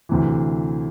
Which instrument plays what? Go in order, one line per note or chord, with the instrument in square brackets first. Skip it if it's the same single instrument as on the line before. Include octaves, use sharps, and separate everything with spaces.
[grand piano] D2 C3 E3